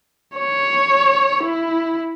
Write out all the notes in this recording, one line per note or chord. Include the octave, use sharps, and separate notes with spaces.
C#5
E4